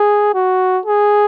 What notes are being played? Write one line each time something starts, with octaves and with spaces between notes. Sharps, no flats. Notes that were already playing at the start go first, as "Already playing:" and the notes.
Already playing: G#4
F#4
G#4